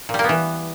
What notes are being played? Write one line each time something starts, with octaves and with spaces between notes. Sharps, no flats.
A#2
G3
A#3
B3
E3